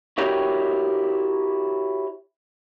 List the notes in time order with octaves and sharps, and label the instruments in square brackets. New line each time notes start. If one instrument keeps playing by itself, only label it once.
[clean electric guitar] E4 F#4 G4 A#4 C#5 G5